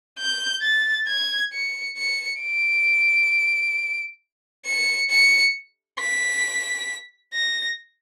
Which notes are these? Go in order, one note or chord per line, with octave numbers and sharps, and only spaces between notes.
G6
A6
G#6
C#7
C#7
D7
C#7
C#7
B6
A#6